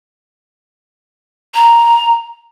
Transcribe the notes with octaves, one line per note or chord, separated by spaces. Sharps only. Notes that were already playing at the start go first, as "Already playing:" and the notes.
A#5